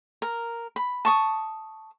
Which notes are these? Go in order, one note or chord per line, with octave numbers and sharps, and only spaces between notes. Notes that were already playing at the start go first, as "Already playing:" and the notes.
A#4
B5
A5 C#6 D#6